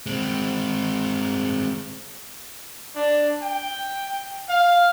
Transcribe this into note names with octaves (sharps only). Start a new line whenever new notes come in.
G#3 C4
D4
G5
F5